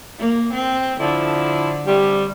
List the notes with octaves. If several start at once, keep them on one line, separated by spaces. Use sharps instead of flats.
A#3
C4
D3 F3 E4
C3 G3 A3 G4